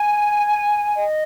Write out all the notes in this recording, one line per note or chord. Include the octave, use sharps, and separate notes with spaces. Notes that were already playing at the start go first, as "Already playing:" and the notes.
Already playing: G#5
D#5